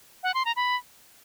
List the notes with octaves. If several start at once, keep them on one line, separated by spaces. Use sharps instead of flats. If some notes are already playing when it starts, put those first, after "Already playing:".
F#5
C6
A#5
B5